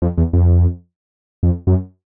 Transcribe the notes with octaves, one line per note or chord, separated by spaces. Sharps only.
F2
E2
F2
F2
F#2